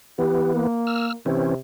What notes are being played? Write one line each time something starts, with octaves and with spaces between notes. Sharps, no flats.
E3 B3 G4
A#3
E6 F6
C3 E3 C4 C#4